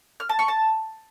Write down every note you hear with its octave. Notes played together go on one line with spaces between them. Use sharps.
F6
A5
C#6
A5